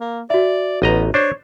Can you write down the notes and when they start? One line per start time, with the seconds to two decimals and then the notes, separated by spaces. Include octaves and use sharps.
0.01 A#3
0.30 F#4 D5 E5
0.82 A1 B3 D#5 A#5
1.14 D4 C5 C#5